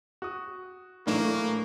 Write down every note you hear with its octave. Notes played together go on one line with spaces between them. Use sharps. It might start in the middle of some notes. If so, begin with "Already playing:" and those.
F#4 D#6
A2 E3 F#3 A#3 D4 E7